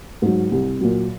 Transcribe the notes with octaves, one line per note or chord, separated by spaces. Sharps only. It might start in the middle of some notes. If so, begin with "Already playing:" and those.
G#2 F#3
C2
A#2 F#3